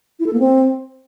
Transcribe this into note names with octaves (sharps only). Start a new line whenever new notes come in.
E4
A4
A#3
C4